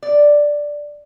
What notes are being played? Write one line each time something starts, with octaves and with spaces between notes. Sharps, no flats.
D5